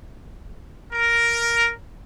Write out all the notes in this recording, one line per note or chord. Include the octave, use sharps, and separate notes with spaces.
A#4